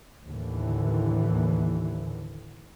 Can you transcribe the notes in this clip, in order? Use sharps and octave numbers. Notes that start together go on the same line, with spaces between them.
D#2 A2 D3 E3